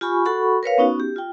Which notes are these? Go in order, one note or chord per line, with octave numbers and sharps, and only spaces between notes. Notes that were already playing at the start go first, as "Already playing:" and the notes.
F4 G4 G#5 B5 C#6
F#4 A4 F#5 B5 C#6
A#4 B4 C#5 F5
B3 C#4 D#4 F#4
G4
F4 G5